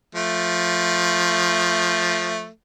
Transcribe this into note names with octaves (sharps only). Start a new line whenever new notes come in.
F3 A3